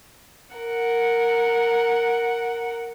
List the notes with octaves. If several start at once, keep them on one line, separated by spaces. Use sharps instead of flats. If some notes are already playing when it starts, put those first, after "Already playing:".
A#4 F#5